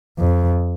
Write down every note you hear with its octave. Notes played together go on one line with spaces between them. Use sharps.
F2